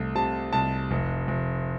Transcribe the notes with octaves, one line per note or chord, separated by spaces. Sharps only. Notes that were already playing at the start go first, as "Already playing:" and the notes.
Already playing: C2 A3
C3 A5
C2 A5
F1
F1